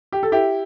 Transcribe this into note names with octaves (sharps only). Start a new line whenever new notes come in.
G4
A4
E4 G4